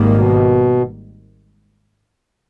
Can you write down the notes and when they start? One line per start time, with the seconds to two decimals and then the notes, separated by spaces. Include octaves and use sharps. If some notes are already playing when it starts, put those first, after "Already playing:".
Already playing: G#1 G#2 D#3 G3 A#3
0.16 B2